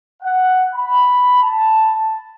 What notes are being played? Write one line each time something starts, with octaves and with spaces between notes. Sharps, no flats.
F#5
B5
A5